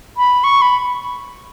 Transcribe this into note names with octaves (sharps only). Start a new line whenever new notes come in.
B5
C#6
B5